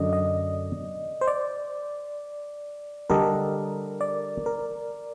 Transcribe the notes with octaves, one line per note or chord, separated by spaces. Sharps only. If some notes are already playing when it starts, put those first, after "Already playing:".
Already playing: F#2 D3 D5 D#5
D#5
C5
D5
D3 G3 D4 A4 A#4 D#5
D5
A#4